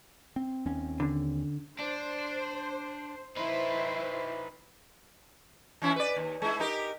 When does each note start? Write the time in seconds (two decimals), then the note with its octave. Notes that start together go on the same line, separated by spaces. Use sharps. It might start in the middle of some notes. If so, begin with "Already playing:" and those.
0.36 C4
0.66 D#2 C4 C#4
1.00 D3
1.79 D4 C5
3.37 D#4 E4 B4 C5
5.82 E3 C#4 E4
5.96 B4 D5
6.16 D#2
6.42 G#3 E4
6.60 D#4 G4 A#4